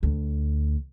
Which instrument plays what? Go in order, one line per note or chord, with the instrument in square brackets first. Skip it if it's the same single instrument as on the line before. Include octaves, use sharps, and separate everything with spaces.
[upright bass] D2